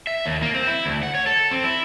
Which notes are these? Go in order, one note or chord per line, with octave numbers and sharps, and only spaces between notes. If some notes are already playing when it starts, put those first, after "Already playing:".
E5
D#2
A#3
C4
E4
D2
F#5
C#5
A4
C4
E4